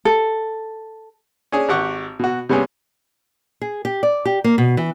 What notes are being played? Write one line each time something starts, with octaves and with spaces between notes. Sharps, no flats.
A4
C#4 D4 G#4
G#1 G4 F#5 C#6
B2 F#4
C3 G3 B3 C#4 G#4
G#4
G4
D5
G4
A#3
B2
E3